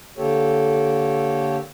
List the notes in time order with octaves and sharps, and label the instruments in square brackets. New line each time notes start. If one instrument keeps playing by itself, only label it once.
[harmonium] D3 A#3 G4 A4 C#5